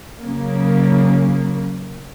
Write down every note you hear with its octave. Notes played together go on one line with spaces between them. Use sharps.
C#3 F#3 A#3